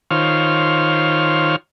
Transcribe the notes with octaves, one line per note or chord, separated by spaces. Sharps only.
D#3 F4 C5 C#5 F6